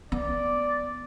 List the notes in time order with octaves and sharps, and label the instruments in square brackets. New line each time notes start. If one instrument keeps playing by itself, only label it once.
[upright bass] B3 [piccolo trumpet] D5